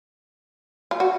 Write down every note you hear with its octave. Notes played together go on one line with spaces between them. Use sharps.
F4
F#4